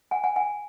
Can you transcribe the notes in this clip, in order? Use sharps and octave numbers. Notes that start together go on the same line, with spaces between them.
F#5 G#5
F#5 G#5
F#5 G#5